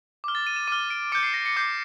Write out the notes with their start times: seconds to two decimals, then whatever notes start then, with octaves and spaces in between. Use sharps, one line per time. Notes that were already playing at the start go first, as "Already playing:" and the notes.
0.24 D6 F6
0.35 A6
0.47 D#7
0.56 E7
0.67 D6 F6 D#7
0.90 D7
1.12 D6 G6 C#7
1.23 C7
1.34 A#6
1.46 C#7
1.56 D6 G6 C7